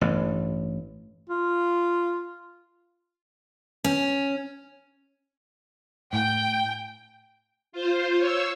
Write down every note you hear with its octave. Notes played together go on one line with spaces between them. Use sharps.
A1 G2
F4
C#4
A2 G5
F4 C5
C#5 E6